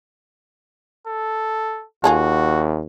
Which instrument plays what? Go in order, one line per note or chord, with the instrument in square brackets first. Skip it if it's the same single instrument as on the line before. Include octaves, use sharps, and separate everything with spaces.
[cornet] A4
[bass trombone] D#2 [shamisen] F4 G#4 A4 [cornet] F#4